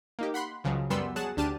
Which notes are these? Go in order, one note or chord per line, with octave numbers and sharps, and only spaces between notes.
A#3 D#4 G4
F#5 B5 C6 F#6
C#2 C#3 F3 F#3
F#2 G3 B3 B5 C6 E6
F#3 G#4 F#5 A5 E7
D2 D4 G4 A5 F6 D#7